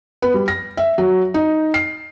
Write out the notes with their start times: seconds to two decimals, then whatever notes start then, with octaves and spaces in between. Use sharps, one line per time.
0.22 B3
0.34 G3
0.48 A#6
0.77 E5
0.98 F#3
1.34 D#4
1.74 C7